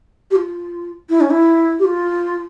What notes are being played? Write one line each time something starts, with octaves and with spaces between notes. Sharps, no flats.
G4
F4
E4
C#4
E4
G4
F4